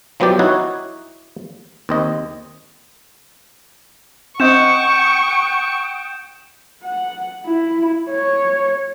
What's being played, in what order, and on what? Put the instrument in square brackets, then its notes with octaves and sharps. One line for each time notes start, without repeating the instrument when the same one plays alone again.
[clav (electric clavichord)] F3 F#3 B3 E4 G4 D5
D#4 E4 F#4 C#5
D#2 C4 D#5
[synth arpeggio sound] C4 D#5 [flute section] F#5 G5 D#6 [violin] C#6 [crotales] G6 E7
[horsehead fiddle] F#5
E4
C#5